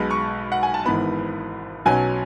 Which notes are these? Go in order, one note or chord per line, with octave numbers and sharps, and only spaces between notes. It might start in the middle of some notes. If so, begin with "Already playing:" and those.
Already playing: B1 B2 G#3 B5
C#6
F#5
G#5
A5
G#1 G#2 E3 B3 B5
B1 B2 F#3 C#4 G#5